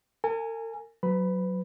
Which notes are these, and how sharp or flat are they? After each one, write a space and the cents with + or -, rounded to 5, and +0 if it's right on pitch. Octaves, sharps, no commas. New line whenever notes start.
A#4 -45 G#5 +0
F#3 +0 B4 +30 B5 +0